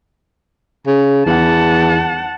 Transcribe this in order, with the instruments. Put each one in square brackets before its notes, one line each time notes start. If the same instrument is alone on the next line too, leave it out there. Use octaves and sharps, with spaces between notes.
[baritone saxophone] C#3
[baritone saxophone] E2 [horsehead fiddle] F#5 A5